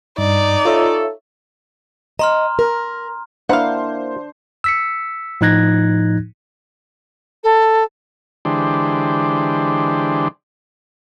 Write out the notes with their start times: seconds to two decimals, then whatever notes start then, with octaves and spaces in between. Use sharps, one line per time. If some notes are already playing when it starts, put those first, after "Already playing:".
0.18 G2 D#4 D5
0.65 F4 A4 C#5 E5
2.19 D#5 A#5 C6 F6
2.59 A#4
3.49 A#3 D4 E4 C5 F5 F#5
4.64 E6 B6 C#7
5.41 A2 F3 D#4 F#6 G#6 A#6
7.43 A4
8.45 D3 E3 G#3 D4 G4 C5